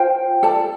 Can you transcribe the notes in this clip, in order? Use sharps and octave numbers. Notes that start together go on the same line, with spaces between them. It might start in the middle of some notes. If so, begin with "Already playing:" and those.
Already playing: F4 C5 G5
A4 D5 A5